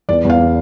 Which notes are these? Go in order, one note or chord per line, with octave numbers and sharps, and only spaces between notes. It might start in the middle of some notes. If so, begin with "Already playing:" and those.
E2 D5
E2 F5